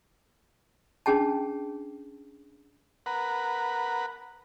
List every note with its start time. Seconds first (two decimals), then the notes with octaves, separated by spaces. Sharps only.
1.06 C#4 D4 G#4 G5 A5
3.06 A#4 B4 F#5